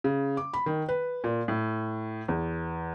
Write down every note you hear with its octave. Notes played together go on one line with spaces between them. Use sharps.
C#3
D6
B5
D#3
B4
A#2
A2
E2